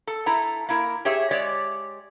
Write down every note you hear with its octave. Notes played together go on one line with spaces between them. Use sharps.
A4
A3 E4 A#5
A#3 E4 A#4
G4 G#4 C#5 E5
G#3 G4 C#5 D5